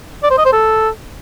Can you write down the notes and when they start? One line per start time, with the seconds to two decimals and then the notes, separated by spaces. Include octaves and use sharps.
0.23 D5
0.30 C5
0.38 D#5
0.45 C5
0.53 A4